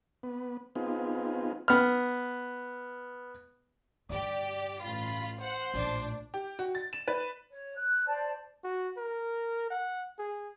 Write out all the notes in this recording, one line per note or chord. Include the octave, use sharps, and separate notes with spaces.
B3
B3 C4 D#4 F4 G#4
B3 F6
G2 D3 G4 D5
A1 F4 B5
C5 F#5
A#1 A2 D4
G4
F#4
A6
E7
B4
C#5
F#6
C5 D5 A5
F#4
A#4
F#5
G#4